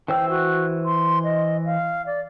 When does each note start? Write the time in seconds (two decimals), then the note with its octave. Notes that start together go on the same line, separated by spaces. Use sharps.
0.08 E3 C5 G5 E6
0.29 F#4
0.85 C6
1.23 D#5
1.65 F5
2.06 D5